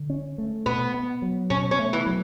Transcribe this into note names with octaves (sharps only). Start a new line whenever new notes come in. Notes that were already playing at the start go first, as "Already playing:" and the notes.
Already playing: D3
C#4
A3
B2 B3
B3
F#3
B2 C#4
C#4
A3
E3
F#3